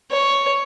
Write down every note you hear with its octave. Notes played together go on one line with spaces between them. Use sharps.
C#5